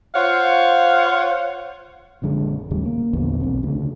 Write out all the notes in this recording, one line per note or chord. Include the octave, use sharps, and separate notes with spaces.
F4 C5 C#5 F5 F#5
A#1 F#2 D3 G#3
D#2 A2 C#3 G3
A#3
A#1 E2 D3 B3
B1 C4
D2 C#3